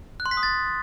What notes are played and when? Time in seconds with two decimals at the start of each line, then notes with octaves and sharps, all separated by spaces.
0.20 F#6
0.26 C6
0.31 B6
0.37 D#6
0.43 A6